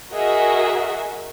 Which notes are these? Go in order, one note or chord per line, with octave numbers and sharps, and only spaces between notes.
F#4 G#4 A#4 D#5 E5 F#5